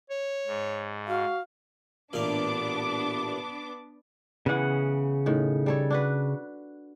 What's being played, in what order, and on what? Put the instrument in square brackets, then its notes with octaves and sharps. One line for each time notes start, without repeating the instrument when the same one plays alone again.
[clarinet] C#5
[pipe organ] G#2
[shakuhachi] F#4 [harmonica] F5
[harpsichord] A1 A#2 F5 [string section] B3 D4 D6
[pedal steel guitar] C#3 F#5 [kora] E3 B3
[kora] A2 D#3
G3 A4 C#5
D4 F#4 B4